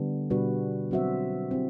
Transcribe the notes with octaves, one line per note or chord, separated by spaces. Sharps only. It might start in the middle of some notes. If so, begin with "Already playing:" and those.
Already playing: D3 G3 B3 D4
B2 G3 D4 F#4 B4
F#3 C4 F#4 C5 E5
C4 E4 G4